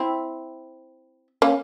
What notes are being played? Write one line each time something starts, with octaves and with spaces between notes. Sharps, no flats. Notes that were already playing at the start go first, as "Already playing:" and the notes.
Already playing: C4 E4
A#3 C#4